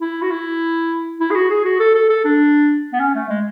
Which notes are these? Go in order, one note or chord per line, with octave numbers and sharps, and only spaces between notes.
E4
F#4
E4
E4
G#4
F#4
G#4
F#4
A4
A4
A4
D4
B3
C#4
A3
G#3